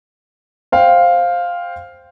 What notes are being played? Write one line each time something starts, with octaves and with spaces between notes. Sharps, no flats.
C5 F5 G5